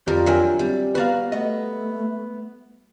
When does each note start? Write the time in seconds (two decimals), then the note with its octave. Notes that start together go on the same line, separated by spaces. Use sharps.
0.07 F2 G3 F4 G4 A#4
0.26 F#3 D4 A#4 E5 G5 G#5
0.59 G3 C4
0.95 B3 F#4 B4 D5 F5 A#5
1.32 A3 B3 D#5